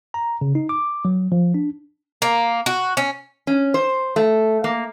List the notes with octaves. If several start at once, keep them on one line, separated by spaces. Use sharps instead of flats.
A#5
C#3
D#4
D6
F#3
F3
D4
A#3
F#4
C#4
C#4
C5
A3
A#3